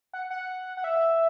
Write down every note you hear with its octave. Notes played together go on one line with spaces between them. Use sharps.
F#5
F#5
F#5
E5